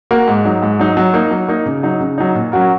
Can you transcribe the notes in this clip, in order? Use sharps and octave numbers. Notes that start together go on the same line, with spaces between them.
A#3 F#4 A#4
G#2
F#3 D#4
G#2
F#3 D#4
F#3
A#3 D#4
F#3
A#3 D#4
C#3
F#3 D#4
C#3
F#3 D#4
A#2
F#3 C#4 F#4 A#4